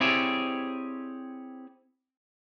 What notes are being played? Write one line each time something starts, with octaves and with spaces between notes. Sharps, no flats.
C4 E4 G4 G#4 C#5 D5